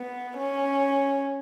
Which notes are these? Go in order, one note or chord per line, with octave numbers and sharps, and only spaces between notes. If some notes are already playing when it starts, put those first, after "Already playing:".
Already playing: B3
C#4